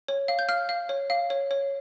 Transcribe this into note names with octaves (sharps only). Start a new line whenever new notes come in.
C#5
F5
G6
F5 F6
F5
C#5
F5
C#5
C#5